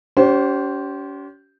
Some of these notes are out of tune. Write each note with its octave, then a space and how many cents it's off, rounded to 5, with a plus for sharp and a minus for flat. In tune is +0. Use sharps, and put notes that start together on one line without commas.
C#4 +40 G4 -40 C5 +0